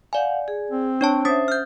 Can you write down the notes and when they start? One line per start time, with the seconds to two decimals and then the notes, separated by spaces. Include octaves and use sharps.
0.13 D5 F5 F#5 G#5
0.48 G#4
0.71 C4
1.01 D4 C#5 G5 A5 C#6
1.25 C#4 C5 E5 D#6 A6
1.48 F6 G6